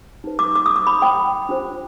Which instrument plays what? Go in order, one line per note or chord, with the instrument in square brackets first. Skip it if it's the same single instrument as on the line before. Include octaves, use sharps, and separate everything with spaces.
[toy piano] D#4 B4
D6
D6
D#6
D6
B5
G5
D4 F4 C5